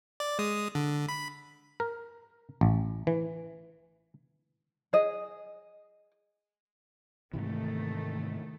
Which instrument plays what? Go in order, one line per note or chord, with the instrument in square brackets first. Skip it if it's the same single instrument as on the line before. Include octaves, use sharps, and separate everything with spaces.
[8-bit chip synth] D5
G#3 D#6
D3
B5
[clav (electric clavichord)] A#4
A1
E3
[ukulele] G#4 D#5
[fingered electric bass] G#2 C3 E3 [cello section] D#3 A3